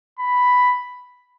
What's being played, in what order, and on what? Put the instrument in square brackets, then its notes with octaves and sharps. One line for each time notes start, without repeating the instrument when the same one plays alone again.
[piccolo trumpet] B5